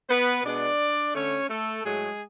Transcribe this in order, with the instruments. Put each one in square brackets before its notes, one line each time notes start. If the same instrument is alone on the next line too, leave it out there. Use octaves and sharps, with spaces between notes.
[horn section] B3 B4
B2 G#3 B3 D4 D5
D3 A3 C#4 C#5
A3 A4
A2 F#3 G#3 A3 G#4